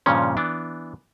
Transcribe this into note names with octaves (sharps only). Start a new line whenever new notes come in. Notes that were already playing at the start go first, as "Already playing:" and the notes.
G2 A#2 C#3 F3 C#4
E3 B3 D4